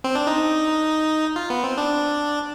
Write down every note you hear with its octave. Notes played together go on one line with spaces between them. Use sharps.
C4
D4
D#4
F4
B3
C4
D4